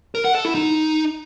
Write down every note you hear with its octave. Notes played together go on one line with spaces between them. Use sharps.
A#4
F#5
A4
E4
D#4